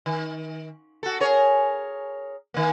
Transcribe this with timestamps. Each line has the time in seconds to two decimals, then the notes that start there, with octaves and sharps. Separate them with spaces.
0.06 D#3
1.03 F#4 A4
1.20 G#4 A#4 C#5
2.54 D#3 A#3